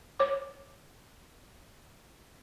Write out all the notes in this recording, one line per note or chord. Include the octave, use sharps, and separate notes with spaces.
C#5 D6